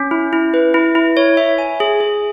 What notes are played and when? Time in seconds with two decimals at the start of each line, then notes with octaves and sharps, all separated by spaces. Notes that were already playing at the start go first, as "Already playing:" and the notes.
Already playing: C#4
0.11 E4
0.33 E4
0.54 B4
0.74 E4
0.95 E4
1.17 C#5
1.37 E5
1.58 G#5
1.80 G#4
2.01 G#4